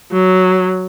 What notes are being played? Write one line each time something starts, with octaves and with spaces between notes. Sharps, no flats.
F#3